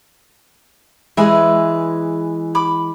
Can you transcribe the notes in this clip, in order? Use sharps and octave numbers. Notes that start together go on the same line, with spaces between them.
E3 G#3 G#4 B4 E5
B5 D6